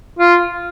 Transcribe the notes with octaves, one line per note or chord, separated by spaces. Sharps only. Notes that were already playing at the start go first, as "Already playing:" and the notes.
F4